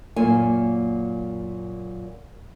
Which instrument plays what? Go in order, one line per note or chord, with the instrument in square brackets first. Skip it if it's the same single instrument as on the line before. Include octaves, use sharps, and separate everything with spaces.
[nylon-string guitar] F#2 A#2 A#3 G#5